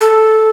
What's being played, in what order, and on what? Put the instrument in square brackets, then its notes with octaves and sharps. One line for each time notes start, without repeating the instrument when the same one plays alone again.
[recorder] A4